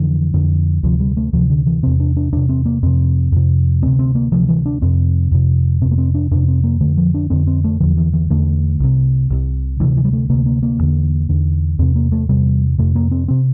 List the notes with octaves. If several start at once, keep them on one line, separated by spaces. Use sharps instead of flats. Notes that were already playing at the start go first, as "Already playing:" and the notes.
Already playing: F2 D3 E3
F2 D3
D2 C3 F3
G3
A3
D2 C3 F3
D3
E3
E2 C3 C4
D4
D4
E2 C3 D4
C4
A#3
F2 C3 C4
F2 C3
D2 C3 C4
C4
A#3
D2 C3 F3
E3
D4
F2 C3 C4
F2 C3
F2 C3 C4
A#3
C4
D4
F2 C3 D4
C4
A#3
F2 D3 A3
F3
D4
F2 D3 C4
C4
A3
E2 D3 F3
E3
E3
E2 D3 A3
C2 C3
C2 C3
D2 C3 E3
E3
G3
A3
D2 C3 A#3
A#3
A#3
E2 D3
E2 D3
E2 C3 C4
A#3
A3
E2 C3 G3
F2 C3 A3
A#3
C4
C3 C4